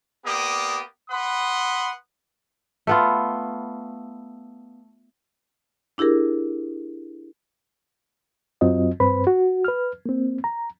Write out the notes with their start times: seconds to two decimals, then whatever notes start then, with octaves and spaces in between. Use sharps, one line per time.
0.24 A#3 B3 G4 D5 D#6
1.10 B4 F#5 B5 C6 D#6
2.87 A3 B3 F4
5.98 D4 E4 G4 G#4 A#4
8.61 F#2 F#3 C4 F4 D#5
9.00 G2 C4 B4 C5 B5
9.27 F#4
9.65 B4 F6
10.06 A#3 C4
10.44 A#5